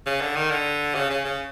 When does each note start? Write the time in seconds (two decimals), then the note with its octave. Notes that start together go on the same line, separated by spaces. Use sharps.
0.06 C#3
0.21 D3
0.36 D#3
0.51 D3
0.95 C#3
1.10 C#3
1.25 C#3